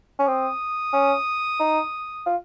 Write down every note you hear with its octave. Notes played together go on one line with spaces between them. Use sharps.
C#4
C4 D#6
C#4
D#4
F4